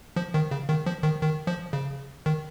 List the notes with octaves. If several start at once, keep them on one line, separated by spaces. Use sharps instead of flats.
F3
D#3
C#3
D#3
F3
D#3
D#3
F3
C#3
D#3